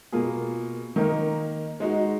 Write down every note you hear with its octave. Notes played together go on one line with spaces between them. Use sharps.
B2 A#3 F4 G#4
D#3 A#3 D#4 A#4
G#3 D#4 F#4